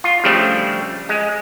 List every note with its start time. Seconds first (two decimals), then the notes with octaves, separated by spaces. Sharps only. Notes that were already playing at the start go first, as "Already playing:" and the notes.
0.04 F4
0.24 C#3 F3 G3 A3 C4 D4
1.09 G#3